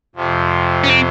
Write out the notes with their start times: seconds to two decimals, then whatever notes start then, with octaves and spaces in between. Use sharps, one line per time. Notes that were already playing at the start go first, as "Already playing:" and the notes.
0.15 F2 C3 F3
0.84 C#4
0.89 C4